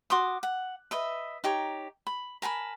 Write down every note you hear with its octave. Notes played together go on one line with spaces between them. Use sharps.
F#4 C6 D6 D#6
F#5
B4 D#5 E5
D#4 G4 C#5 A#5
B5
A#4 G#5 A5 B5